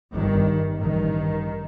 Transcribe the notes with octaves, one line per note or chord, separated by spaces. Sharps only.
G1 G2 D#3
A1 G2 D#3